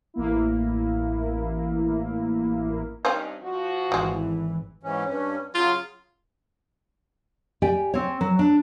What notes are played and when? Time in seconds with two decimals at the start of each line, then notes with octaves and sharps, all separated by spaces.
0.14 A1 A#3 E4
3.05 G2 C4 C#4 D#4 C5
3.42 F3 F#4
3.92 G#1 E3 G3 G#3
4.83 G#2 E3 C#4
5.07 G2 C#4
5.54 C#3 F#3 F4
7.62 G4 D5 G5 G#5
7.94 C4 C#5
8.21 F#3
8.39 D4